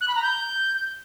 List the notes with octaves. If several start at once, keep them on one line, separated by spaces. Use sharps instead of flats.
F#6
B5
A#5
G6